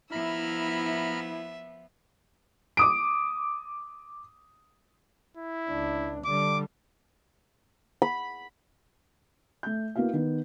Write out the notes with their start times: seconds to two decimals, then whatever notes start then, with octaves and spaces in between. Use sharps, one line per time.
0.12 F3 B3 E4 E5 A#5 B5 F6
2.77 D6 D#6 D7
5.37 E4
5.69 C#2 D4
6.25 D3 G3 D6
8.02 B5
9.63 A3 G6
9.96 A#3 B3 E4 F#4 F5
10.13 D#3 B3